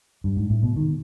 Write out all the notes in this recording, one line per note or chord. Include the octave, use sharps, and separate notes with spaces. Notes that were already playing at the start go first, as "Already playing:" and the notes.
G2
G#2
A2
B2
D#3